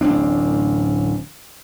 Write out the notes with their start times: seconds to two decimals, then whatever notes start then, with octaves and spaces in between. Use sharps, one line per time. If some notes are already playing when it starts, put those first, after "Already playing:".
0.01 D1 A1 C4 D4